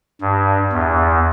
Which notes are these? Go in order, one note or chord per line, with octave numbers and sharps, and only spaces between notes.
G2
E2